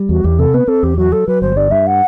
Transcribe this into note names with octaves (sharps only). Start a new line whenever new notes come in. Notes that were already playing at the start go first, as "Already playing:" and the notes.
Already playing: G3
E2 F#4
E2 G4
C3 A4
B3 B4
C4 A4
E2 G4
F#3 F#4
F#3 A4
F#3 B4
G1 C5
G2 D5
G2 E5
F#5